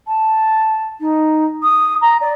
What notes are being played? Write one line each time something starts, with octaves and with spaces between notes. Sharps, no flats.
A5
D#4
D#6
A#5
D5